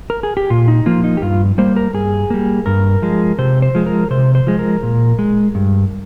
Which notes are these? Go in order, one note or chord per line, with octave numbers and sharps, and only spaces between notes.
A#4
G#4
G4
A#2 F4
D#4
F3 A#3 F4
D#4
G4
G2 F4
G3 A#3 C5
A#4
G2 G#4
G3 A#3
G2 A#4
F3 G#3
C3 C5
C5
F3 G#3
A#4
C3 C5
C5
F3 G#3
A#4
A#2
G#3
G2